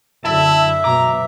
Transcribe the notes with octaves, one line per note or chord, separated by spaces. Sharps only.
F#2 D3 E4 E5 A5
G#2 B2 F#3 A#5 D6